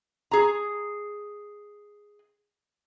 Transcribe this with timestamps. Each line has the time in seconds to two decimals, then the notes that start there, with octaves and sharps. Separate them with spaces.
0.31 G#4 A#5